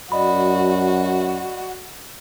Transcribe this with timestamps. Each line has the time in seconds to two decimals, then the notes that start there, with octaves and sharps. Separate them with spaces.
0.12 F#2 F#4 D5 D#5 B5